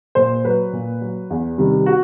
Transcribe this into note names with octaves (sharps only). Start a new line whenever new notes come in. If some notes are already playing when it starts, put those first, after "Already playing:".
A#2 C5
F#3 B4
A#2
F#3
E2
C3 D#3 G3
F#4